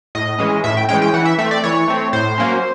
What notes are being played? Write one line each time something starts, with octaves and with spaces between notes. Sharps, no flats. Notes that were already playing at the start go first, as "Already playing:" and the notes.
A2 D#5
E3 G#3 C#4
A2 E5
G5
E3 G#3 C#4 G5
G5
E3 F#5
E5
A3 C4 E5
D5
E3 C#5
A3 C4
A2 C5
F#3 A#3 C#4